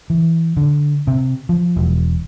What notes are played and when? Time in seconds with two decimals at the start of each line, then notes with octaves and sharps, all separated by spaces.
0.10 E3
0.57 D3
1.07 C3
1.49 F3
1.76 E1